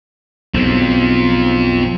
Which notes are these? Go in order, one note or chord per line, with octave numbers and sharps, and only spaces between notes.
B1 G#2 F3 C4